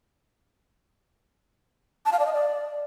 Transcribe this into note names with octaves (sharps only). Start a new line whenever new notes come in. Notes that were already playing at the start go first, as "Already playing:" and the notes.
A5
F5
D5
D#5
D5